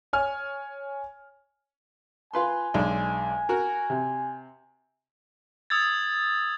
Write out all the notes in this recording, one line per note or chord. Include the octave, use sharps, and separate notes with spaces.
C#5 G#5 F6
F4 B4 G#5 C6
B1 G#3 D4
F#4 A#4
C3
D#6 E6 G#6 A6